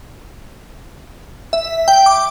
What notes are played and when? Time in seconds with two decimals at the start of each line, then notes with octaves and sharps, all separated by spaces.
1.53 E5
1.88 G5
2.06 D6